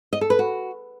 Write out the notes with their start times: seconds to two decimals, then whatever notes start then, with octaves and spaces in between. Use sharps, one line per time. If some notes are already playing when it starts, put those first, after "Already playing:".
0.13 D#5
0.21 A4
0.30 B4
0.39 F#4